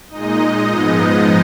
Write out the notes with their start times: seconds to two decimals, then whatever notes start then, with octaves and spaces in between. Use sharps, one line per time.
0.09 A#2 G#3 D#4 D#5
0.70 G#2 F3 G#3 B3 D#4